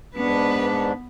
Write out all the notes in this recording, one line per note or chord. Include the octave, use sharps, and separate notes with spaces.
G#2 B3 D4 B4